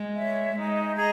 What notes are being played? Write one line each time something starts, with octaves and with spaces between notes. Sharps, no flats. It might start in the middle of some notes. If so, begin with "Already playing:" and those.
Already playing: G#3
C#5 E5
G#3 D#4
G#4 D#5 A#5